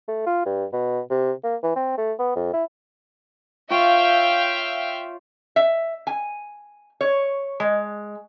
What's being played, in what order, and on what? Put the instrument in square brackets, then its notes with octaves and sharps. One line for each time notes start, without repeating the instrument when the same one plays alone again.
[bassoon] A3
F4
G2
B2
C3
A#3
E3
C4
A3
B3
F2
E4
[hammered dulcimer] F4 C#5 [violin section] E5 F5 G5
[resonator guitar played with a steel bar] E5
G#5
C#5
G#3